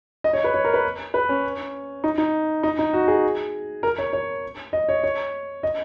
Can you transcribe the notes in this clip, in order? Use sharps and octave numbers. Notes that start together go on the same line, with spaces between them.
D#5
C#5
B4
C#5
A#4
B4
B4
C#4
D#4
D#4
D#4
D#4
F#4
G#4
A#4
C#5
C#5
D#5
C#5
C#5
D#5